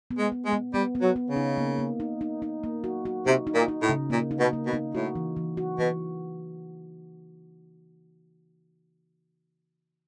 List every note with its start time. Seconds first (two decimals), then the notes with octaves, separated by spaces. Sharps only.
0.11 B3
0.18 G#3
0.32 B3
0.46 G#3
0.53 B3
0.74 G3 B3
0.95 B3
1.02 F#3
1.16 B3
1.30 C#3
1.36 D#4
1.57 A#3
1.79 A#3
2.00 D#4
2.21 D#4
2.42 D#4
2.64 A#3
2.84 F#4
3.05 F#4
3.26 C3 D#4
3.47 D#4
3.54 A#2
3.68 D#4
3.82 A2
3.89 C#3
4.10 A#2 A#3
4.31 D#4
4.39 B2
4.53 A#3
4.66 B2
4.73 D#4
4.95 A2 F#4
5.15 E3
5.36 E3
5.57 F#4
5.78 B2 E3